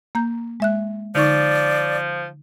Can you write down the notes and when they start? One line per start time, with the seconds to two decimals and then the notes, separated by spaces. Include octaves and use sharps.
0.15 A#3 A#5 G6
0.60 G#3 E5 F#6
1.15 D3 F3 D#4 D5 C#6